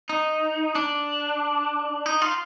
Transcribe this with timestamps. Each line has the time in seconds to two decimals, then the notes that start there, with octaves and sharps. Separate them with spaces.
0.09 D#4
0.75 D4
2.06 D#4
2.22 F4